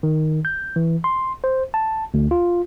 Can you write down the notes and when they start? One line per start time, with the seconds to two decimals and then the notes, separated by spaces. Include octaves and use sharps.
0.03 D#3
0.45 G6
0.76 E3
1.04 C6
1.44 C5
1.74 A5
2.14 D2
2.31 F4